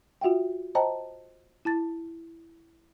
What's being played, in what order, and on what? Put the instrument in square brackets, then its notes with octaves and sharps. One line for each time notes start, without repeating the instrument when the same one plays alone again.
[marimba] F4 F#4 E5 F#5 G5
C5 D#5 G5 A5 A#5
E4 A5 A6